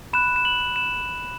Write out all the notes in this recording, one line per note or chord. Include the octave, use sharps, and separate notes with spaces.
B5 F#6 E7
E7
F#7
E7